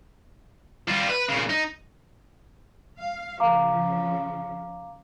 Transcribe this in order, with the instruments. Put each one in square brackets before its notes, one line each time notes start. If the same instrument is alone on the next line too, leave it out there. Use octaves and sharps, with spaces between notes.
[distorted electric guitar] G3 F4
B4
A#2 C#3
D#4
[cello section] F5
[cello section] C#3 F3 [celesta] F5 A#5 D6